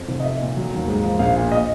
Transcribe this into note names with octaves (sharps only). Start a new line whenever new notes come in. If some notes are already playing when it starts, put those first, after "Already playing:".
Already playing: F2
F1
D#5
C4 E5
A#2
F#3
D#2
G#2
F3
A#1 F5
A#2
D#5